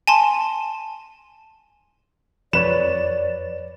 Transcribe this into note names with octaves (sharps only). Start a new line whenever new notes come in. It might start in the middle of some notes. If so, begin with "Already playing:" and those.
G#5 A5 C6
F2 B4 C#5 D5 E7